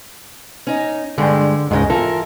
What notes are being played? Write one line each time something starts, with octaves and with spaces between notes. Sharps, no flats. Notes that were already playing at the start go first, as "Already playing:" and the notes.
C#4 D#4
G2 D3 G#3 G5
C#2 G#2 D#3 G#3 D#5
E3 F4 A4 A#4